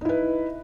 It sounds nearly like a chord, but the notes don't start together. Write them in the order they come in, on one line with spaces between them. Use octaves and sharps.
D#4 E4 B4